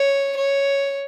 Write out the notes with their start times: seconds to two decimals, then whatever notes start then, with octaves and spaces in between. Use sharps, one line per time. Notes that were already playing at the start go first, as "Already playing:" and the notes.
Already playing: C#5
0.37 C#5